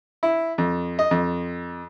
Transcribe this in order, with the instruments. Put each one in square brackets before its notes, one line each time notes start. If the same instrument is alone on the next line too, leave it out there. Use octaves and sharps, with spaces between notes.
[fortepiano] E4
F2
D#5
F2